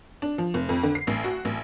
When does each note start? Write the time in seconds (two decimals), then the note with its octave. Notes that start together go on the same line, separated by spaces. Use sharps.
0.22 D4
0.38 F3
0.54 F1
0.69 F2
0.83 D3
0.95 C7
1.07 A1
1.24 F#4
1.45 A1